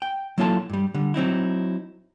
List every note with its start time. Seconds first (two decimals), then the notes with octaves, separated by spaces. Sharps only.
0.02 G5
0.38 F#3 A#3 E4 F4 A4 A5
0.69 G2 G3
0.94 D3 G3
1.14 F#3 C4 D#4 E4